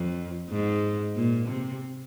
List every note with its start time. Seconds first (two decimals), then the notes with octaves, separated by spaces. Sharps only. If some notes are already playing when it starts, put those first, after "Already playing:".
Already playing: F2
0.49 G#2
1.16 A#2
1.49 C3